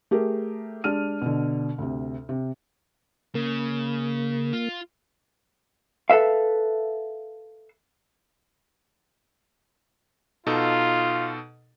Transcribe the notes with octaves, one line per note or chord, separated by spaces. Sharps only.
A3 G4 G#4 A#4
G#3 D4 G4 F6 D#7
B2 D3
D2 C3
C3
C#3 A#3
F4
A4 B4 E5 F5
B2 D#4 F4 A4